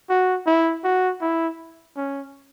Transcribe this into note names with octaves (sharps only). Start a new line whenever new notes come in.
F#4
E4
F#4
E4
C#4